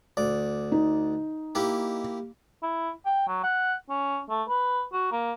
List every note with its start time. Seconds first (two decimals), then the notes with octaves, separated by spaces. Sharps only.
0.17 D2 D5
0.72 D#4
1.55 A#3 E4 G4
2.63 E4
3.06 G5
3.27 F#3
3.44 F#5
3.90 C#4
4.30 A3
4.49 B4
4.93 F#4
5.12 A#3